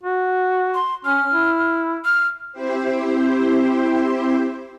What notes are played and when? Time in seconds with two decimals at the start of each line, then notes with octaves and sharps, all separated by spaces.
0.04 F#4
0.74 C6
1.05 C#4 F6
1.34 E4
2.05 F6
2.52 C4 E4 G4 C5